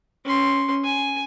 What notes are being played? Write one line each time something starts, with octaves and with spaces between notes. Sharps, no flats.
C#4 C6
G#5